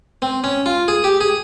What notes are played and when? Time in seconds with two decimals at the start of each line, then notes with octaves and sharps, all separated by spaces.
0.22 C4
0.44 C#4
0.66 F4
0.88 G#4
1.04 G4
1.21 G#4